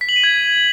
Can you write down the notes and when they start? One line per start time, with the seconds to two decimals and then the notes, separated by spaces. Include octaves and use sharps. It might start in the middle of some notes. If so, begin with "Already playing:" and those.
0.01 B6
0.09 F#7
0.16 D#7
0.24 G#6